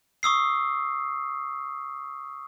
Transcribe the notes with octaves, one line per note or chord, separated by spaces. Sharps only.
C#6 D#6 E6 C7